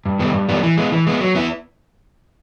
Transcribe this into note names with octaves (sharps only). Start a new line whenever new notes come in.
G2
D#3 G3 B3
G2
D#3 G3 B3
E3
G#3 B3
E3
G#3 B3
F#3
B3 E4